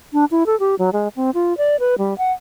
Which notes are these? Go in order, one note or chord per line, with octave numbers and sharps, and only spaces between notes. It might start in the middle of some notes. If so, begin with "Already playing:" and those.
D4
E4
A4
G4
F#3
G#3
C4
F4
D5
B4
G3
F#5